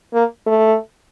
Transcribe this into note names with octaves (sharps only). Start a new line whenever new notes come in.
A#3
A3